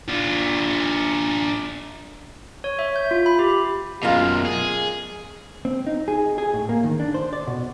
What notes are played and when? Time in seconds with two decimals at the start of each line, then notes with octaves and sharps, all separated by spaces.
0.08 D4 F4
2.64 C#5
2.79 E5
2.96 G6
3.11 F4
3.26 B5
3.39 G4
4.03 F#2 B2 G#3 A#3 F4
4.46 G#4
5.65 C4
5.87 D#4
6.08 G#4
6.38 G#4
6.53 A2
6.69 A#3
6.84 D#3
7.00 D4
7.14 C5
7.33 D5
7.47 B2